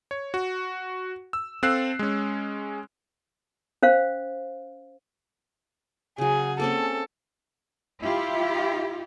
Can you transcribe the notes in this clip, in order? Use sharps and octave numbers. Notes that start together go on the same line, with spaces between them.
C#5
F#4
E6
C4 A4 F5 E6 F#6 C7
G#3 C#4
C#4 C5 F5
C#3 F#3 G#4
A#3 C4 C#4 A4
E4 F4 G4